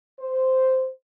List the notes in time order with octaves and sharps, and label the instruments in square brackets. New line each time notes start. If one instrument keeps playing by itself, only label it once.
[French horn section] C5